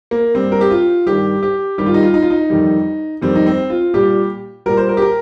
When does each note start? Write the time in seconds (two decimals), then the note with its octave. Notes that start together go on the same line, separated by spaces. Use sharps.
0.11 A#3
0.35 G2 G3 C4
0.52 A#4
0.61 G4
0.71 F4
1.07 G2 D#3 G3 G4
1.42 G4
1.78 G2 D#3 G3 G4
1.86 F4
1.94 D#4
2.03 F4
2.14 D#4
2.22 F4
2.30 D#4
2.50 F2 D#3 G3
3.22 F2 D#3 G3 C4
3.36 D#4
3.46 C4
3.70 F4
3.94 A#2 G3 G4
4.66 A#2 G3 A#4
4.77 C5
4.89 A#4
4.97 G4
5.02 A#4